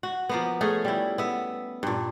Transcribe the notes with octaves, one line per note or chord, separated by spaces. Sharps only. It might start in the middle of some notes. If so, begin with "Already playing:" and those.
F#4
F3 A#3 B3
A3 C#4 G#4
G3 E4
B3 E5
G2 A#2